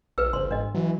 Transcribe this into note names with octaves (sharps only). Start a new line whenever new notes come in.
A#1 B4 E6
G1 C#2 C5 C6
G#2 D4 D#5
E3 F#3